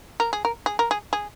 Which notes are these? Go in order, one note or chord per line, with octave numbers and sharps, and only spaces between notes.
A#4
G#4
A#4
G#4
A#4
G#4
G#4